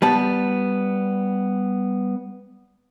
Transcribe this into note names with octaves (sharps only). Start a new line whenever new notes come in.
G3 B3 A5